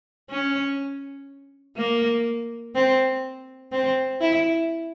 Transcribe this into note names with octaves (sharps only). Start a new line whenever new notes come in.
C#4
A#3
C4
C4
E4